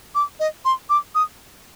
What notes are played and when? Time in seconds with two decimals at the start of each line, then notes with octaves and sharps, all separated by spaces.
0.15 D6
0.40 D#5
0.65 C6
0.89 D6
1.15 D#6